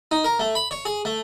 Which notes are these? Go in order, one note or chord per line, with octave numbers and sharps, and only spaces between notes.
D#4
A#4
A3
B5
C#5
G#4
A3